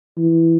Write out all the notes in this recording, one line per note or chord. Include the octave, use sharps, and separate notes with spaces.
E3